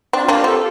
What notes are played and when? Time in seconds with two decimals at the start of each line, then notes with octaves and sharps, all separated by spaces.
0.13 C4 D4
0.24 F4
0.28 A#3 D4 G4
0.44 C4 A4